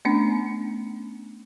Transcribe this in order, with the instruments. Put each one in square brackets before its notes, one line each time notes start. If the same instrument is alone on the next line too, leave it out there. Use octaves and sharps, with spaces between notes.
[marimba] A3 B3 C#4 D4